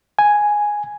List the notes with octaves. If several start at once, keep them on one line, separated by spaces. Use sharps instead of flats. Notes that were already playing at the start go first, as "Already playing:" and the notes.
G#5